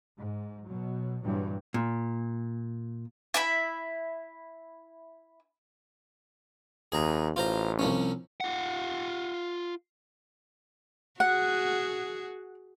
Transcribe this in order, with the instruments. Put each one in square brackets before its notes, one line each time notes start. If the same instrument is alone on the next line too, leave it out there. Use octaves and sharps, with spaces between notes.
[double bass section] G#2
B2 F#3
G2 A#2 E3 F#3
[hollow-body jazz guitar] A#2
[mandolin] E4 E5 B5
[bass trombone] D#2 [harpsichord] G#4 A#5
[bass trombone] A1 [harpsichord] F4 C5 A#5
[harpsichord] C2 F3 C#4
[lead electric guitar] F4 F#5
[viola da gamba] F#4 G#4 [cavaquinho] F#5